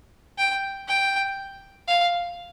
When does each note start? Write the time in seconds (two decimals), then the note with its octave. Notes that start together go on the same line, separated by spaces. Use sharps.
0.38 G5
0.88 G5
1.88 F5